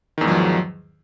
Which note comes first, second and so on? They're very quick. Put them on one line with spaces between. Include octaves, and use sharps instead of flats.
D#3 E2 G#2 F3 F#3